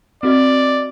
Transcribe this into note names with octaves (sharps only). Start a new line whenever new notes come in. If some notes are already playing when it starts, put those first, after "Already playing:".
C4 F#4 D5 D#5